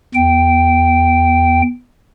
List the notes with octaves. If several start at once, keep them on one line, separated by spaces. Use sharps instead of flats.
E2 G5